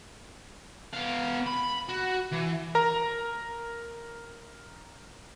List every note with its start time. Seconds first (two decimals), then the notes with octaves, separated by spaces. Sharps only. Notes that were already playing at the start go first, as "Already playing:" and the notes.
0.93 B3 F5
1.46 B5
1.89 F#4
2.32 E3
2.75 A#4 A#5